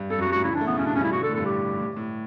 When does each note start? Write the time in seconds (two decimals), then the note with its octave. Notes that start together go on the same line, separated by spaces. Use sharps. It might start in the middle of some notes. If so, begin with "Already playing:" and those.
Already playing: G2
0.10 G2 A4
0.18 F#2
0.21 F#4
0.27 G2
0.32 F#4
0.36 A2
0.44 C#3 E4
0.53 E3 D4
0.61 A3
0.67 C#3 B3
0.78 B2 C#4
0.86 D4
0.95 G2 C#4
1.04 E4
1.12 B2 F#4
1.21 D3 A4
1.29 A2
1.35 G2 A4
1.46 G4
1.80 A2
1.97 A2